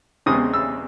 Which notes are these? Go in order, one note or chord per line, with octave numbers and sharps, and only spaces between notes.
E2 C#3 G#3 C4 D#6
E6